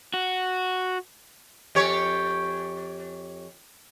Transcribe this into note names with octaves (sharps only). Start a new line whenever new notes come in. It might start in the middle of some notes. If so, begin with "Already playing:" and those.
F#4
F2 G4 C#5